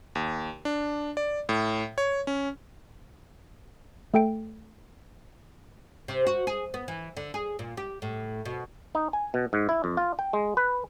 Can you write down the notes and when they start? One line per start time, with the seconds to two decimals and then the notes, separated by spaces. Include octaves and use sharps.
0.15 D#2
0.65 D4
1.17 D5
1.49 A2
1.98 C#5
2.27 C#4
4.14 A3 A4 G5 D7
6.08 C3
6.26 F#4
6.47 G#4
6.74 B3
6.88 E3
7.17 D3
7.34 G#4
7.59 A#2
7.77 G4
8.02 A2
8.45 B2
8.95 D#4
9.13 G#5
9.34 B2
9.53 G#2
9.69 E4
9.84 F2
9.97 F4
10.19 G5
10.33 G#3
10.57 B4